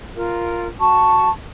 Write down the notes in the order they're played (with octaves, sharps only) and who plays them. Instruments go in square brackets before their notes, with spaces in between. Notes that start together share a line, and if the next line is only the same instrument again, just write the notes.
[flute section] F4 A#4
F#4 A5 C#6